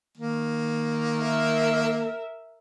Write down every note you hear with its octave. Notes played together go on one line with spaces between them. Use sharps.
D#3 A#3
A#4 E5